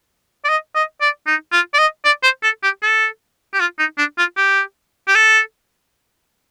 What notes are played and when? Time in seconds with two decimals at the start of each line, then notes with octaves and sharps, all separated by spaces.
0.45 D5
0.49 D#5
0.75 D#5
1.01 D5
1.27 D#4
1.52 F4
1.74 D5
1.79 D#5
2.05 D5
2.23 C5
2.43 A4
2.63 G4
2.83 A4
3.54 G4
3.60 F4
3.79 D#4
3.98 D4
4.18 F4
4.37 G4
5.08 G4
5.16 A4